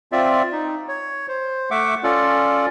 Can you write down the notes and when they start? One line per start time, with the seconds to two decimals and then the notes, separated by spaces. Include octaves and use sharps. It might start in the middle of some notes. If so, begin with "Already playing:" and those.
0.12 C4 F4 D5 E5
0.52 D#4
0.88 C#5
1.28 C5
1.71 A3 E5 F#5 D6
2.04 C#4 F4 A4 D5